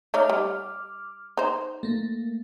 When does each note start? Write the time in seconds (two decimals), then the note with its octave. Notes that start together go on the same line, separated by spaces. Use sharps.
0.14 A3 D#4 C#5 D6 F6
0.30 G3
1.37 D#4 C5
1.83 A3 A#3